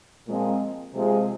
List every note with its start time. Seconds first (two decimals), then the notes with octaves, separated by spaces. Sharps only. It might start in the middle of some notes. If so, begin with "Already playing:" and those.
0.26 A#2 F3 G#3 C4
0.92 C3 F3 G#3